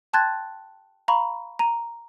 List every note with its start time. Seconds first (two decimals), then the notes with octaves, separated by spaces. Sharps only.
0.13 G5 A5 C6 F#6 G#6 A6
1.08 F5 A#5 B5 C#6
1.59 A#5 D#7